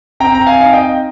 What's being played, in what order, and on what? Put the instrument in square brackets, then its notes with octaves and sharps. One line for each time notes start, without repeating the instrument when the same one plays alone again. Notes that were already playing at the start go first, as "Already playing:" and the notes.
[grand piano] C4 G5 A#5
A#5
F5 G#5
D#4 F5
D#5 G5